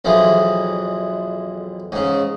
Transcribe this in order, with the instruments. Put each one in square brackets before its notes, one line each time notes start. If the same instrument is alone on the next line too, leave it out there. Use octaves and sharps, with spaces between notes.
[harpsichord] B1 F2 E3 G#3
G#2 C#3